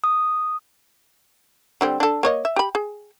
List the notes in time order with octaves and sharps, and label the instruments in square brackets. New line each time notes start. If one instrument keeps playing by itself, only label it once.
[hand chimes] D#6
[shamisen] D3 G3 C4
D4 A4
A#3 C#5 D#5
E5
G4 B5
G#4